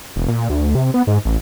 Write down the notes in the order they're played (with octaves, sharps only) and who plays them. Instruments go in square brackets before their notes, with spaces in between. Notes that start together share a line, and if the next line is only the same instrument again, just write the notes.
[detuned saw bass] E1
A#2
D2
C3
B3
G#2
A1